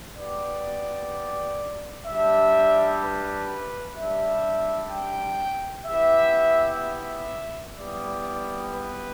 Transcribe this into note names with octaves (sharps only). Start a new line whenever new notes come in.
B3 G4 D5
G3 D4 G4 E5
B4
G3 D4 G4 E5
G5
B3 E4 G4 E5
E5
G3 B3 E4 G4 D5
B4